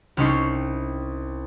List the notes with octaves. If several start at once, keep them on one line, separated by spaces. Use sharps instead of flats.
C2 G3 C#4 D#4 C#6 C7